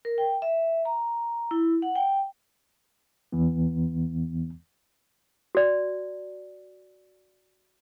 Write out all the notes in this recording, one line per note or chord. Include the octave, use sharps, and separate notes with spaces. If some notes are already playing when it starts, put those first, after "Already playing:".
A#4
G5
E5
A#5
E4
F#5
G5
E2 E3 B3
F#4 D5